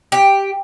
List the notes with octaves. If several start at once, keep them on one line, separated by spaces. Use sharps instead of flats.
G4